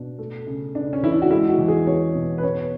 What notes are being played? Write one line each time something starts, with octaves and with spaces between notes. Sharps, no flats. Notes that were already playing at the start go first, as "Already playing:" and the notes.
Already playing: B2 D4
A3
C#3
C#3 D4
C#4
E3 E4
D4
F#4
G#3 E4
F#4
E2
G#4
B3 C#5
B2
B4
B3 C#5